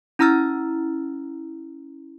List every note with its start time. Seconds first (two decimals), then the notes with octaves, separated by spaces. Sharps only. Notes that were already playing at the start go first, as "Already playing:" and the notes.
0.19 C#4 E4 A#5 E6 F6 A6